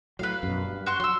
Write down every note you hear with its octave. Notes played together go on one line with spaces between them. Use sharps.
A2 F#3 B4 F5
F#2 B2
G2
F#4 C6 C#6
F#3 C6 E6